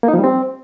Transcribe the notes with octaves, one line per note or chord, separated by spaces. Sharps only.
A#3
D#4
F3
G3
C4